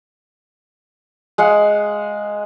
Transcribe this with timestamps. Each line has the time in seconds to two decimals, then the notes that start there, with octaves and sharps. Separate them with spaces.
1.38 G#3 F5 F#5